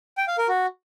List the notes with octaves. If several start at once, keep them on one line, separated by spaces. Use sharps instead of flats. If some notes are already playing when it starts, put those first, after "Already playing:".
G5
F5
A#4
F#4